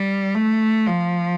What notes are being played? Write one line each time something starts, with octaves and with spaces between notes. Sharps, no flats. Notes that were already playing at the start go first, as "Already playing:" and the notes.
Already playing: G3
A3
F3